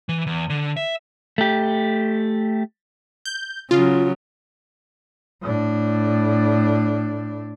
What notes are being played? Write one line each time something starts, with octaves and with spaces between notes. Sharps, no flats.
E3
E2
D3
E5
A3 G4
G6
C#3 F#3 F4
A2 D4